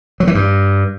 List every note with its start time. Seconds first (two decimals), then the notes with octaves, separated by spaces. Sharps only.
0.20 F#3
0.27 E3
0.35 G2